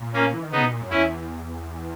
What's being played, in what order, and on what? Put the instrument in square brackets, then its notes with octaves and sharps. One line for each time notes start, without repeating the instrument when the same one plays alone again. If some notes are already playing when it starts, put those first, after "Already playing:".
Already playing: [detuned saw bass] A#2
[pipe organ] A#3 C#4
[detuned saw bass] E3
D#3
[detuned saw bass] C#3 [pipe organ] B3 D#4
[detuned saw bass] B2
A#2
F#2
[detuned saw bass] E2 [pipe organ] C#4 E4